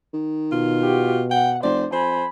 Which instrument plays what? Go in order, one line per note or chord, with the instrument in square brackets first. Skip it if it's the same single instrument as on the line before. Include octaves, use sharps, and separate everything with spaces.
[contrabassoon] D#3
[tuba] B2 [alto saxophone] F4
[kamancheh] F#4 G4
[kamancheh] F#5 [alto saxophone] G5
[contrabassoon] F1 [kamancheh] C5 [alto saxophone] D5
[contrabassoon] F2 [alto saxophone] C5 [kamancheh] G#5 B5